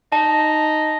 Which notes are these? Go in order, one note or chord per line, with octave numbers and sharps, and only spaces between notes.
D#4 A5